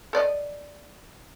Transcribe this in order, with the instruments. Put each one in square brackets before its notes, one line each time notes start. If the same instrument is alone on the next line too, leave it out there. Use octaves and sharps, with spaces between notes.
[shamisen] A4 D5 D#5